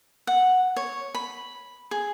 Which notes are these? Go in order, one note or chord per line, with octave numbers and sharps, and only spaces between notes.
F#5
C#5
B5
G#4